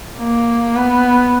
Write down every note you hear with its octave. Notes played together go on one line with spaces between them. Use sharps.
A#3
B3